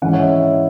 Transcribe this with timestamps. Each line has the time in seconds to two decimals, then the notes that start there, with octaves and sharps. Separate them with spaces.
0.02 G#2 E3 C#4 F#5
0.14 C#5
0.20 E5